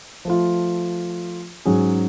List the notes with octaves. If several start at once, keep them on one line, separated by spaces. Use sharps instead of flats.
F3 A3 F4
G#2 F#3 C#4 G#4